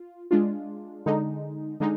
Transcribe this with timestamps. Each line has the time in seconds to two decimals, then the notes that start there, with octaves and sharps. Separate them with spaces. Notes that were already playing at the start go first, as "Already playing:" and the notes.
Already playing: F4
0.31 G#3 D4 F4
1.06 D3 G#3 D#4
1.80 D3 G#3 D#4